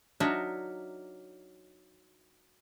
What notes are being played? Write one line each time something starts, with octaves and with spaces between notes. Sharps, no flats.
F#3 D4 D#4 A#4 E5